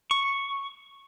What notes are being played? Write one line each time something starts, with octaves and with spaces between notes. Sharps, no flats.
C#6